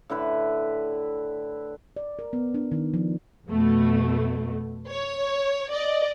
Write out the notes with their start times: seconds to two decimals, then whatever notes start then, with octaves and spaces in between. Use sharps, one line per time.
0.09 A2 D3 E4 B4
1.97 D5
2.19 A#4
2.33 B3
2.54 D4
2.72 D#3
2.94 F3
3.47 F2 B2 A3
4.87 C#5
5.71 D5 D#5